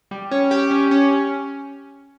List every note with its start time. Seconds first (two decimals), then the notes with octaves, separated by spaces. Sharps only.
0.11 G3
0.31 C#4
0.51 G4
0.71 C#4
0.91 C#4